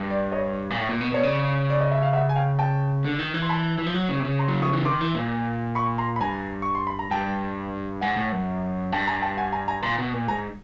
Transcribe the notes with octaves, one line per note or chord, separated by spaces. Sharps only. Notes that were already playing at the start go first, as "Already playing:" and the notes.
Already playing: G2
D5
C#5 D#5
A#2
A2
A#2
B2
B2 C#5
C#3 D5
D5
D#5
E5
F5
E5 F#5
G#5
F5 G5
G5 A5
D3
D#3
E3
C6
A5 B5
E3
F3
F#3
C#3
C3
C#3
A#5 C6
F#3
F3 C#6 D#6
E3
D#3 C6 D6
E3
A#2
B5 C#6
A#5 C6
B5
G2 G#5 A#5
C#6
C6
B5
A#5
G2 G5 A5
G#2 F#5 G#5
A2
F#2
G2 G5 A5
G#5 A#5
G5 A5
F#5 G#5
G#5 A#5
G#5 A#5
A#2 A#5 C6
B2
A#2
G#2 G#5 A#5